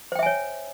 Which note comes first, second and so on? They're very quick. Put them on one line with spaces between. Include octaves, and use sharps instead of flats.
C5 G5 E5 G#5 C#5